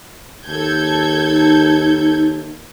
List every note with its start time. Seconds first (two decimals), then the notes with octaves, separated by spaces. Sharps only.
0.48 D#2 A4 G6 G#6
1.28 D#4